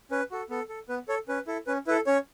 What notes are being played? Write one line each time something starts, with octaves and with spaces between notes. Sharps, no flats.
C#4 B4
F#4 A4
B3 A4
A4
B3 B4
A4 C#5
C#4 B4
E4 A4
C#4 B4
E4 A4 B4
C#4 C#5